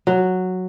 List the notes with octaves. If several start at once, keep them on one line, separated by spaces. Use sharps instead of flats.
F#3